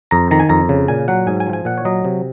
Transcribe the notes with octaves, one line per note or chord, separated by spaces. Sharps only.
F2 A#5
D#3 A#5
G#5
F2 A#5
C#3
A#2 G#5
F#3 F#5
G#2 G#5
G#5
F3
G#5
A#2 F#5
C#5
F#3 D#5
C3